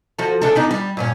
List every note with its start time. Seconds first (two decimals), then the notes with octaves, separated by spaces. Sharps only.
0.19 F3 F#4 A4
0.42 C#3 D4 A4
0.55 B3 D4 D#4
0.71 G3
0.97 G2 A#2 C#4